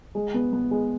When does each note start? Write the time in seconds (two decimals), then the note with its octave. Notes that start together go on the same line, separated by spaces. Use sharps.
0.15 G#3
0.34 B3
0.53 B3
0.71 G#3